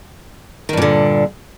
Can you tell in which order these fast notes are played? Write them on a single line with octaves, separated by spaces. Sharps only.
D#3 G2 A#2 D3